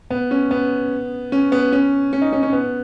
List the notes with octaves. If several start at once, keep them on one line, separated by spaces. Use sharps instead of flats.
B3
C#4
B3
C#4
B3
C#4
C#4
D#4
C#4
C#4
B3